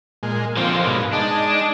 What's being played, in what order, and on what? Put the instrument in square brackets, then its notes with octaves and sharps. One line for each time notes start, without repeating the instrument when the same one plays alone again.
[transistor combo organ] A#2 G#3
[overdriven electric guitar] D3 A#3 [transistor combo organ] F3 C4
[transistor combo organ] G#2 B2
[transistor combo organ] G#3 D#4 [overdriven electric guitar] D4